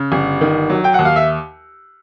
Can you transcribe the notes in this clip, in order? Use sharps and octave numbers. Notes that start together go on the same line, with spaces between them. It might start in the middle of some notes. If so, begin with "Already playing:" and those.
Already playing: C#3
G1
D#3
F#3
G5
D#2 F#5
F5
E5